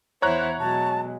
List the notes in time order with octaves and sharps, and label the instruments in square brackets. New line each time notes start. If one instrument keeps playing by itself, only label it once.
[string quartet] E2 E4 F#5 [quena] C5 [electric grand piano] C#5 A#5 F#6
[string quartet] B2 F#3 G#3 [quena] A5